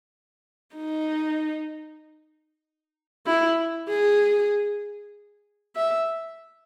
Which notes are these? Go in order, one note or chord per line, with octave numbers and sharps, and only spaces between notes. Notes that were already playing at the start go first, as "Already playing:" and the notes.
D#4
E4
G#4
E5